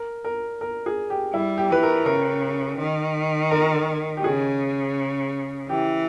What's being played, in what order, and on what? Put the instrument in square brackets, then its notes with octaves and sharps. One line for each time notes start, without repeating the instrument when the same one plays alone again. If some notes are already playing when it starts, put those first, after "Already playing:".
Already playing: [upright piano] A#4
A#4
A#4
G#4
G4
[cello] G3 [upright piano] E4
[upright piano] G4
[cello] E3 [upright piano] B4
[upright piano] A#4
[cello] C#3 [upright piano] A#4
[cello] D#3
[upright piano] A#4
G4
[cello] C#3 [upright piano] G#4
[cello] E3 [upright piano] G4